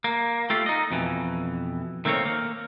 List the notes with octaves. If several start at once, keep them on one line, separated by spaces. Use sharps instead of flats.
A#3
A3 F4 G4
D#4 D#5
F2 B2 E3
D#3 A3 A#3 C4 C#5
A#3